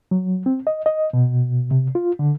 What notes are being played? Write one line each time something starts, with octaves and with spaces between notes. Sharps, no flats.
F#3
C4
D#5
D#5
B2
C3
F4
D3